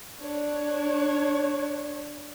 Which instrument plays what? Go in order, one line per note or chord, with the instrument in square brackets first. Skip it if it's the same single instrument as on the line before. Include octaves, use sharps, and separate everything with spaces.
[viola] D4 C#5